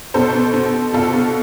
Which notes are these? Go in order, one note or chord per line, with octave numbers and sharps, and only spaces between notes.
B2 A4 C5
B2
B2
B2
B2 F4 A4
B2